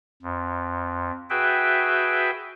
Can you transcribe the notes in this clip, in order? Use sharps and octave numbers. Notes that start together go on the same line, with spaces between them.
F2
F#4 G#4 B4 E5 G5